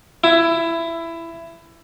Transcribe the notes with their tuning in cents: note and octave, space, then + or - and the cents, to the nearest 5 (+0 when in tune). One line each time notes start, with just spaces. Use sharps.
E4 +15